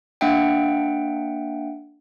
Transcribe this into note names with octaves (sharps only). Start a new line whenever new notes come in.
A#3 D4 E5 F#5 G5